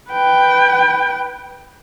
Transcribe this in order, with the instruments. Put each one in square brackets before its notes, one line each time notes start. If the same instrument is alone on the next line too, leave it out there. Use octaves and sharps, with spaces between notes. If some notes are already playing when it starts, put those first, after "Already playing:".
[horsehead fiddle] B4 G5